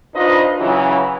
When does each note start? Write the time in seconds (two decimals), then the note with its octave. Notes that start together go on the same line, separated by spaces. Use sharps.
0.15 D4 D#4 F4 B4 C5 D#5
0.59 C#3 E3 F#3